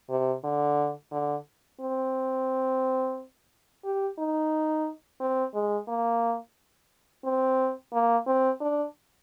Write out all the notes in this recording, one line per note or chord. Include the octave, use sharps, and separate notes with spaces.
C3
D3
D3
C4
G4
D#4
C4
G#3
A#3
C4
A#3
C4
D4